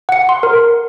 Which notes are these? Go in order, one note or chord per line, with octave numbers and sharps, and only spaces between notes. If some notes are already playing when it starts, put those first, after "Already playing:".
F#5 C#7
C6
A#4